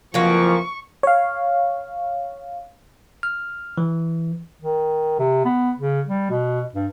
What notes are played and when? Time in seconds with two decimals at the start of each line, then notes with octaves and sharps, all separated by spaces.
0.14 F#1 F2 E3 F3 A#3 F#4 C#6
1.03 C#5 F5
3.23 F6
3.78 E3
4.62 D#3
5.19 C3
5.45 B3
5.78 C#3
6.07 G3
6.30 B2
6.74 G2